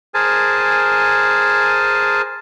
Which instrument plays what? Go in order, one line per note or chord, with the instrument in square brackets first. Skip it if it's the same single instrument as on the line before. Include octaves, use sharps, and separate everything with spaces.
[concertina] G#4 A#4 C5 G#5 A5